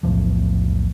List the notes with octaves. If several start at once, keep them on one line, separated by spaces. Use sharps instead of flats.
B1 E2 A2 F3